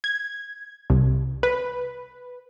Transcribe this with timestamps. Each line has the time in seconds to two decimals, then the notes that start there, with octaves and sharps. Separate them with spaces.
0.04 G#6
0.90 C2
1.43 B4